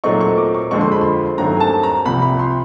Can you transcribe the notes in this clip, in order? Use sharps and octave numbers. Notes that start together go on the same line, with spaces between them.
A#2 F#3 A3 C4 D#4 C#6
C#6
D6
C#6
F2 D3 F3 G#3 C4 C#6
C6
B5
C6
G2 D#3 F#3 A3 C4 A#5
G#5
A5
A#5
C2 C3 F3 B5
B5
C6